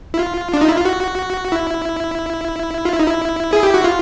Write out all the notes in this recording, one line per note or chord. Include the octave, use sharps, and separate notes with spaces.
E4
F4
D4
D#4
E4
F4
F#4
E4
F4
E4
D#4
E4
G#4
G4
F#4
F4